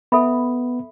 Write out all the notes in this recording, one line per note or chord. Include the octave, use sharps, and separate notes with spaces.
B3 A4 E5 B5